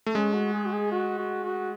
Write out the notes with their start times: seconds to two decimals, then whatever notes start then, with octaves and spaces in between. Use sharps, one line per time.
0.06 A3
0.15 G#3 C#4
0.34 F#4
0.53 G#4
0.66 F#4
0.72 G#4
0.92 F#4
1.18 F#4
1.44 F#4